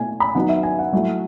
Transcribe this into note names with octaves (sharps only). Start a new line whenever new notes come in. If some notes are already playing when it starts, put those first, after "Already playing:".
Already playing: B2 A3 E4 G#5
B5
D#3 F#3 B3 D#4 F#5
E5
G#5
F#5
F#3 A3 E4